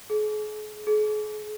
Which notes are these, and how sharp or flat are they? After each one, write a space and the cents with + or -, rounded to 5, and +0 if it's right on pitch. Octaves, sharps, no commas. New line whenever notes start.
G#4 +45
G#4 +45